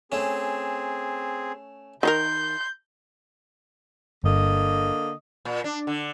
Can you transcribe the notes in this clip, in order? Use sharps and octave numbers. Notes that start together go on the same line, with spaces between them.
A3 C4 C#4 G#4
D#3 D#4 A#4 C6 G6
G1 D3 A#3 D#5
A#2
D4
D3